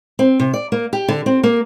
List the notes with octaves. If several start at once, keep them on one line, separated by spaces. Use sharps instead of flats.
C4
C3
D5
A#3
G4
D3
C4
A#3